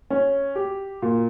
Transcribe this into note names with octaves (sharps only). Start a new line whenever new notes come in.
C#4
G4
A#2